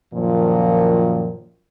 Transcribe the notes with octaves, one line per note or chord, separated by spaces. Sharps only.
F#2 A#2 D#3 F3